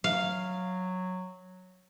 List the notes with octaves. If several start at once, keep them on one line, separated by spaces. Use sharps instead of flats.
F#3 F5